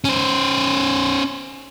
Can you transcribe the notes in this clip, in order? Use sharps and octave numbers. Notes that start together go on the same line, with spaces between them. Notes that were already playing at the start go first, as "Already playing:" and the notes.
C#4 C5